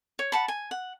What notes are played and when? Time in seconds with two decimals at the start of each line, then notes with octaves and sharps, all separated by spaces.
0.19 C#5
0.32 F#5 A5 B5
0.48 G#5
0.71 F#5